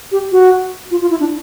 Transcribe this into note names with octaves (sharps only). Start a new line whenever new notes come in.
G4
F#4
F4
F4
E4
D4